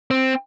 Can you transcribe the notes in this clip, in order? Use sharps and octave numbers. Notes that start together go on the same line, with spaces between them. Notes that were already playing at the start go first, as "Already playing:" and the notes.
C4